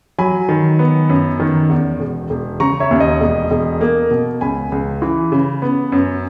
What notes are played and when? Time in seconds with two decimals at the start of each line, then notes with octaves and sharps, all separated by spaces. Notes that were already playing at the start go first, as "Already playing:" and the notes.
0.18 F#3 G#5 B5
0.49 D#3
0.79 B3
1.09 F#2
1.40 D#3
1.69 E2
2.00 E1
2.30 E1
2.60 C#3 A#5 C#6
2.80 C#5 E5
2.91 D#2
3.00 D#5
3.20 E1
3.51 E1
3.81 A#3
4.11 B2
4.41 C#2 G#5 B5
4.72 C#2
5.02 E3
5.32 C#3
5.62 B3
5.92 F#2